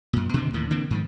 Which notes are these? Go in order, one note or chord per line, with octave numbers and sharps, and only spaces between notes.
F#2 A#2
B2 D3 D#3 C4
D#2 A2 D#3
D3 E3 A#3 C4
G#2 D#3 F3